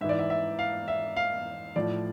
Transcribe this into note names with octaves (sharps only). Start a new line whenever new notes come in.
G#2 E3 E5
D5
E5
E5
F5
E5
F5
A2 F3 D5